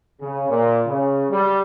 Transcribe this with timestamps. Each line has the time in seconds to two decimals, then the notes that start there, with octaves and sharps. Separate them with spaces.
0.20 C#3
0.50 A#2
0.86 C#3
1.30 G3